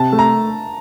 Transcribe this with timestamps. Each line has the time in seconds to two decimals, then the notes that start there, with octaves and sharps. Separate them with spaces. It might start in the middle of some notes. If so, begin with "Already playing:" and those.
Already playing: C3 A5
0.12 A3
0.19 A#5